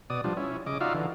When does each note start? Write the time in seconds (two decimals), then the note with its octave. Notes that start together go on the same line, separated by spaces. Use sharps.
0.10 B2 D5 D#6
0.24 F3 G3 D4
0.37 C#4 E4
0.67 C#3 D#5 D6
0.81 D#4 F4 F#4 D5 E5 F5
0.95 D3 E3